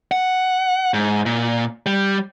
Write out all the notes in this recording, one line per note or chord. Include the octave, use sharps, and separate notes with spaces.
F#5
G#2
A#2
G3